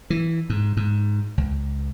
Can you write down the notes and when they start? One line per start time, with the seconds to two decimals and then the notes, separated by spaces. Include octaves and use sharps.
0.10 E3
0.50 G#2
0.77 G#2
1.38 C#2